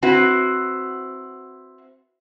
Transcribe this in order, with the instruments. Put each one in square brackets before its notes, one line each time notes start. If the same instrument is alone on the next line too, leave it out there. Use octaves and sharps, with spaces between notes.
[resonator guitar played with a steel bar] C4 E4 F#4 B4